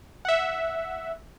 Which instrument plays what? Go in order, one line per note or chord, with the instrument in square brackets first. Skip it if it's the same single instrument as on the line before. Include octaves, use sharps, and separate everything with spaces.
[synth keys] E5 F#5